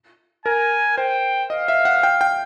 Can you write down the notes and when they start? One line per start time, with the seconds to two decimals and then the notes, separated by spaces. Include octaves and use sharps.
0.46 A#4 G#5
0.98 C5 G5
1.50 D#5 F5
1.68 E5
1.85 F#5
2.03 G5
2.21 G5